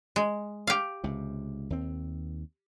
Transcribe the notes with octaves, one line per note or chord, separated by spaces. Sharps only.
G#3
G4 F5
C#2 C3
D#2 C4